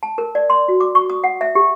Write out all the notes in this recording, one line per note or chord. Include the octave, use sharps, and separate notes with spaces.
A5
A#4
D5
C6
F#4
D6
C#6
D#6
F#5
E5
G4